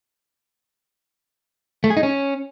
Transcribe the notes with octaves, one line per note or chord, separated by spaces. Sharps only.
A3
G#4
D#4
C#4